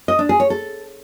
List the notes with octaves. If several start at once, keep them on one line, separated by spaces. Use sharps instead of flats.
D#5
D4
G#4
C#5
A4